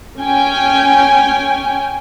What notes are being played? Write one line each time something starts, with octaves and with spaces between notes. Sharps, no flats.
C#4 G5 G#5